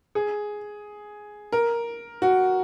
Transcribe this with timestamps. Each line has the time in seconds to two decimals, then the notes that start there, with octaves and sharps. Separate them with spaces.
0.15 G#4
1.52 A#4
2.22 F#4